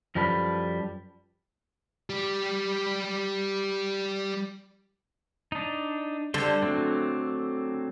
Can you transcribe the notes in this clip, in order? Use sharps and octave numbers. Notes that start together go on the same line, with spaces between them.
F#2 F3 G3 A4 B4
G3 G4
D4 D#4
D3 G3 A4 C5
F#3 A3 C4